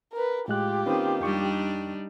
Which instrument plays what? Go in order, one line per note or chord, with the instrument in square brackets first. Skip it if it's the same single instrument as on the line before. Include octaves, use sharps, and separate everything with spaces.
[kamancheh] A#4 B4
[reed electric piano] A2 G#3 F#6 [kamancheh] F4 G4
[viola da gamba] D#3 A#3 D#4 [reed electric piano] C4 C#4 B4
[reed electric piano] F2 G5 C#6 [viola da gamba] G3 D4 D#4